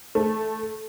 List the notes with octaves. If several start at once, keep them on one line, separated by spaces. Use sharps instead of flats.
A3